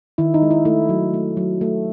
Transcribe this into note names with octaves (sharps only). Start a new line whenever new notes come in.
D#3 E4
D#4
G#3
E4
A3 E4
F#3
A3
F#3
A3